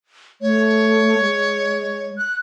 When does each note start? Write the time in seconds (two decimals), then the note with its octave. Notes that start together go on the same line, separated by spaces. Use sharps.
0.41 A3 C#5
1.20 G#3
2.18 F#6